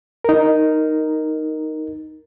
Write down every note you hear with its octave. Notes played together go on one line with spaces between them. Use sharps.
D#4 A#4